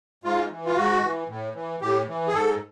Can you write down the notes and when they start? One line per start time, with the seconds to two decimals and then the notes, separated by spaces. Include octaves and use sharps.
0.24 G#2 F4
0.51 E3
0.66 F4
0.76 G#2 F#4
1.03 E3
1.29 A2
1.55 E3
1.81 A2 G4
2.08 E3
2.28 G#4
2.34 G#2 A4